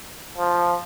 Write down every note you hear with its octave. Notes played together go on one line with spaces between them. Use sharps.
F3